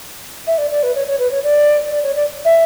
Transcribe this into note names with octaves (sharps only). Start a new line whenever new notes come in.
E5
D5
D5
B4
C#5
C#5
B4
C#5
D5
D5
C#5
D5
E5